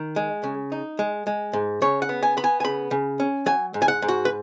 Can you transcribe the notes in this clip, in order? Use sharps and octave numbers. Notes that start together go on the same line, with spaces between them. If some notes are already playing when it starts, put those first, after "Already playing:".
Already playing: D#3
G#3
C#3
D#4
G#3
G#3
G#2
C#3 C#5
F#5
B3
G#5
B3 B5
G#5
G#5
C#3 B5
C#3
C#4
F#3 G#5
G#2
G#5
F#5
G#2
F#4
B4